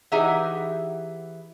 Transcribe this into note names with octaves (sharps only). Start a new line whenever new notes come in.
E3 D#4 G4 G#4 E5 F#5